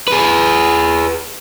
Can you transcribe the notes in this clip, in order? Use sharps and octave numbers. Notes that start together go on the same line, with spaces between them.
G#4 B4